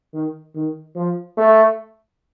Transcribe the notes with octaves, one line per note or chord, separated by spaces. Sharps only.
D#3
D#3
F3
A3